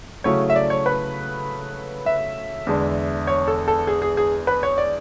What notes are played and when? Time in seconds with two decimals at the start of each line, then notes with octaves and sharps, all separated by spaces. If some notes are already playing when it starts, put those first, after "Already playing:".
0.24 C#3 F#3 A3 C#4 E4 C#5
0.50 E5
0.56 D5
0.70 C#5
0.86 B4
2.06 E5
2.67 E2 D3 G#3 D4
3.27 C#5
3.48 A4
3.68 A4
3.87 G#4
4.02 G#4
4.17 G#4
4.47 B4
4.63 C#5
4.78 D5